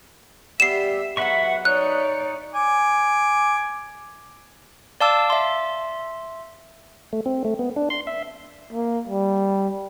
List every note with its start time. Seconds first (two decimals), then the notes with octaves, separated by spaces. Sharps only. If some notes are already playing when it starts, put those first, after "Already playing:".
0.60 G3 B3 G4 E5 C7 E7
1.17 F#3 G#3 B3 B4 E5 F#5 C#6
1.65 D#4 C#5 D5 F#6
2.54 G#5 D6
5.00 D5 F5 A5 D6 E6
5.30 E5 C6
7.13 A3
7.26 C4
7.45 A3
7.59 B3
7.76 D4
7.90 C6
8.07 E5
8.73 A#3
9.07 G3